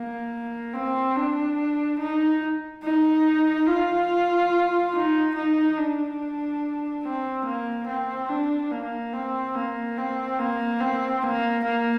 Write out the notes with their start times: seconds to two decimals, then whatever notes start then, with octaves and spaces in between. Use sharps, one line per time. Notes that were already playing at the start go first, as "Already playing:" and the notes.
Already playing: A#3
0.73 C4
1.15 D4
1.99 D#4
2.83 D#4
3.67 F4
4.93 D#4
5.35 D#4
5.77 D4
7.03 C4
7.45 A#3
7.87 C4
8.29 D4
8.71 A#3
9.13 C4
9.55 A#3
9.97 C4
10.39 A#3
10.81 C4
11.23 A#3
11.65 A#3